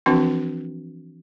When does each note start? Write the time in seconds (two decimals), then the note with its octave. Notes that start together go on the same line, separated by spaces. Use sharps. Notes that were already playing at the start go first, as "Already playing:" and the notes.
0.06 E3 F3 C4 D4 F#4